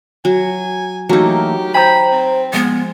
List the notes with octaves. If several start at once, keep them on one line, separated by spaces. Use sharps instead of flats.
F#3 G#5
E3 F#3 A3 A#3 D#4 G4
C5 G5 A#5 B5
C4
F3 G#3 B3